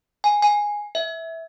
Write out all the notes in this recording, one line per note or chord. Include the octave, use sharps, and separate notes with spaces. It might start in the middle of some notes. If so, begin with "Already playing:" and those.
G#5
G#5
E5